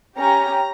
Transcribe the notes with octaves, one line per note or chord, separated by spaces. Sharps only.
C#4 G4 A#5